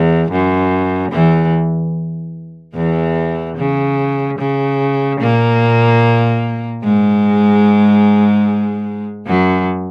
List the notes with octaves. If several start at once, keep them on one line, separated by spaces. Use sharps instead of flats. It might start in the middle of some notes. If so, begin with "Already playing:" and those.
Already playing: E2
F#2
E2 E3
E2 E3
C#3
C#3
A#2 A#3
G#2 G#3
F#2 F#3